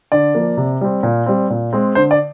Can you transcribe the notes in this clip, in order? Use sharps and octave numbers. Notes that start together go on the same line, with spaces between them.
D3 D5
F3 A#3
C3
G3 C4
A#2
G3 C4
A#2
G#3 C4
D3 C5
D5